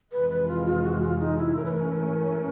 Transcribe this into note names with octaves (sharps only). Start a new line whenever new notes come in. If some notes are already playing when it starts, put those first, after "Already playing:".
F2 C3 E3 G#3 B4
B4
F4
F4
F#4
F4
D#4
E4
G2 E3 A3 C#4 A#4
B4
A#4